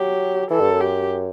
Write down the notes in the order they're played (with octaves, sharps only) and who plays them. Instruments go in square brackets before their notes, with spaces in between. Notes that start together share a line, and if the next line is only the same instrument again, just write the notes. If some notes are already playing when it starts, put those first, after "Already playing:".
Already playing: [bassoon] F#3 [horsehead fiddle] G4
[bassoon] E3 [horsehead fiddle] A4
[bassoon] G2
F#2
[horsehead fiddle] G4